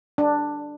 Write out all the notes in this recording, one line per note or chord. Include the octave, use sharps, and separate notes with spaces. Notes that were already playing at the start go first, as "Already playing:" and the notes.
D4